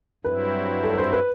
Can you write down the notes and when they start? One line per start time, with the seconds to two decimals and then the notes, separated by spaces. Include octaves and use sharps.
0.24 G2 F#3 C4 E4 B4
0.84 A4
0.93 B4
0.98 C5
1.12 B4